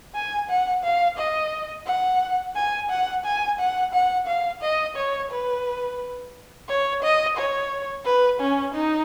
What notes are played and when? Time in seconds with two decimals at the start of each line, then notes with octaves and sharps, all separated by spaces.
0.15 G#5
0.50 F#5
0.83 F5
1.18 D#5
1.86 F#5
2.55 G#5
2.90 F#5
3.24 G#5
3.59 F#5
3.93 F#5
4.27 F5
4.62 D#5
4.96 C#5
5.31 B4
6.68 C#5
7.02 D#5
7.37 C#5
8.05 B4
8.40 C#4
8.74 D#4